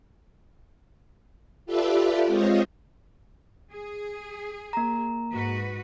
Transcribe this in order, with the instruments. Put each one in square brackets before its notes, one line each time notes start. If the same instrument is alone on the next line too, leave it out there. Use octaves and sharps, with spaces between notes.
[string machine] F4 G4 A4 B4 D5 E5
G#3 C4 F4 C5 C#5 D#5
[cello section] G#4
[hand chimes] A#3 A#5
[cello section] G#2 F#4 B4